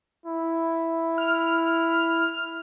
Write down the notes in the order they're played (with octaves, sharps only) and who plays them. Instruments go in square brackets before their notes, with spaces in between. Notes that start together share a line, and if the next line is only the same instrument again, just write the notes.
[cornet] E4
[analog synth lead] F6